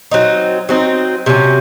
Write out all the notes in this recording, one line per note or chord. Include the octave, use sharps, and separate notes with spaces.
F#3 C4 D#4
F#3 C4 D#4
C3 F#3 A#3 C#4